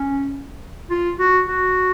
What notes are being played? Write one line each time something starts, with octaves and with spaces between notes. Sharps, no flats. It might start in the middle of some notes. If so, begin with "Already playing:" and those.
Already playing: C#4
F4
F#4
F#4